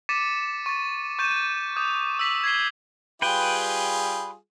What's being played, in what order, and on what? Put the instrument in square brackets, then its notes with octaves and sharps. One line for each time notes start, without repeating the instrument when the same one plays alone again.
[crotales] D6 A6 B6 C#7 D#7 E7
C#6 A6
C#6 G6 A6 D#7 E7
D6 D#6 G6
E6 B6 F#7
G#6 B6 C7 G7
[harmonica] G3 F4 G#4 [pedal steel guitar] B4 G5